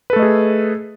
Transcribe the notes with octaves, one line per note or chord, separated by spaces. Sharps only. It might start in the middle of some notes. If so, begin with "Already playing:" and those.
A3 G#4 A4 B4 D#5